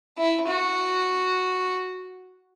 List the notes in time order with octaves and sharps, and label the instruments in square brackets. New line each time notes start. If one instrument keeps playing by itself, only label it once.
[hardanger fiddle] E4
F#4